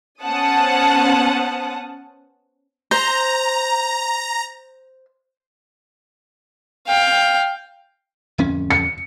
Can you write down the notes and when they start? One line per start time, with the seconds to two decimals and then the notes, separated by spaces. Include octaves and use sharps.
0.23 B3 C#4 C5 F#5 A5 D#6
2.91 C5 A#5
6.87 F5 G5
8.38 D1 F2 C#4
8.70 C#7